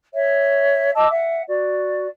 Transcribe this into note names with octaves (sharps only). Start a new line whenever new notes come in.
C#5 E5
D#5 A5 D6 E6
E5 F#5
F#4 D5